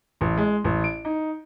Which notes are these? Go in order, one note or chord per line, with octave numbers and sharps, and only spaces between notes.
A1
G#3
A1
D7
D#4